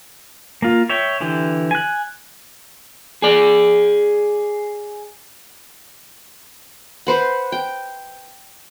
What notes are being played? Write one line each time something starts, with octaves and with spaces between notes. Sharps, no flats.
A#3 F4
C#5 E5 G5
D3 E3 G4
G#5 F#6
G#4 D5
B4 C5 F#5
G5